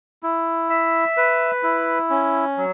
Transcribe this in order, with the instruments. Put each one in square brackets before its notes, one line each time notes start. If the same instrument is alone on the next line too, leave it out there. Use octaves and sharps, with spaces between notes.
[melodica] E4
E5
B4
E4
C#4
F#3